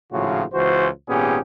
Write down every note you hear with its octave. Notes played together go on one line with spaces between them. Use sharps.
G#1 A2 C#3 F3 F4 F#4
C#2 E3 F#4 C5
G#1 A#2 B3 C#4 G4 G#4